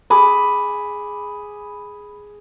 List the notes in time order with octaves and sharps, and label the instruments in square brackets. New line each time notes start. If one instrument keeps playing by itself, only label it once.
[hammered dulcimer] G#4 B5 D6